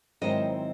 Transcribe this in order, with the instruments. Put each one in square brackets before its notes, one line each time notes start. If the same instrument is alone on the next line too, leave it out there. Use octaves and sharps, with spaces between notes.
[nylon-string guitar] G#2 D#3 F#3 C4 E4 C5 D#5